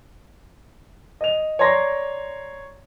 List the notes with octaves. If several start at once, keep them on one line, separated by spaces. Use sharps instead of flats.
D#5 F7
C#5 D5 A#5 C6 A#6